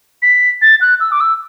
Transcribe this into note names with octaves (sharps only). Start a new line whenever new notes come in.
B6
A6
F#6
E6
D6
E6